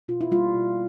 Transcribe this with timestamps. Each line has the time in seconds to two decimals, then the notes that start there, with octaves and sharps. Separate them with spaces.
0.08 B2 F4
0.21 E4
0.31 G3 A#3 F4
0.55 B2